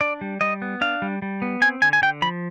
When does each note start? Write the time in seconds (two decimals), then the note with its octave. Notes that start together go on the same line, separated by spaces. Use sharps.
0.01 D4 D5
0.21 G3
0.41 G3 D#5
0.62 B3
0.81 D4 F5
1.02 G3
1.22 G3
1.42 B3
1.61 C4 G#5
1.82 D3 G#5
1.93 G#5
2.02 D3 G5
2.22 F3 B5